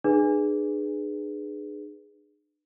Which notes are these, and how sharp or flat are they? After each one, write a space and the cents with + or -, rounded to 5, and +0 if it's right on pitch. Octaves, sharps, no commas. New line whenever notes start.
D4 +45 G#4 +0 B4 +0